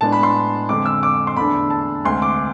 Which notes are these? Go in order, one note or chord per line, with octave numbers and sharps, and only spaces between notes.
A2 G#3 B3 D4 A5
B5
C6
F2 D3 G#3 C4 D6
E6
D6
C6
E2 D3 A3 D4 B5
A5
D2 C3 G#3 C6
D6